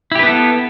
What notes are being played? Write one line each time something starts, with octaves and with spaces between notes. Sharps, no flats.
B3 E4 G4 A4 B4